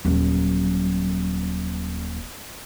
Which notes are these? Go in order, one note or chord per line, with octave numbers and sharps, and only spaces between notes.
D#1 F#3